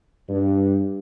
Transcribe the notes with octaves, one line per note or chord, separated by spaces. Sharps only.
G2